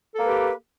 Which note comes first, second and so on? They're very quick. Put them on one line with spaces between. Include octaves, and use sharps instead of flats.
A4 A#3 B4 G4